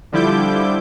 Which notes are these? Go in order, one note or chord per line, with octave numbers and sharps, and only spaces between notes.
D3 F3 G3 E4 D6 G6